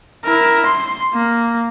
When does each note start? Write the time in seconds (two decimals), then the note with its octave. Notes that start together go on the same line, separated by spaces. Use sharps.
0.24 E4 A#4
0.66 C6
1.14 A#3